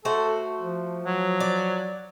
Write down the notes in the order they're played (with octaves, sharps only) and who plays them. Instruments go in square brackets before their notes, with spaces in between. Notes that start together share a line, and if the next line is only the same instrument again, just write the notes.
[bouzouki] A3 F#4 C5 [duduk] A4
[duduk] F3
[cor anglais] F#3
[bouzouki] D5